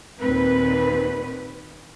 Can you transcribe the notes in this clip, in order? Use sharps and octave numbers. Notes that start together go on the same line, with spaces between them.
D#2 A#2 C4 B4